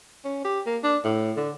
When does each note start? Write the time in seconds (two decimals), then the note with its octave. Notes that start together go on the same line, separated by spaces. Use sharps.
0.25 C#4
0.45 G4
0.66 A#3
0.83 D4
1.04 A2
1.37 D3